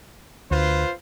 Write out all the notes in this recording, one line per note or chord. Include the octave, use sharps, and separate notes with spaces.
D2 F4 B4 C5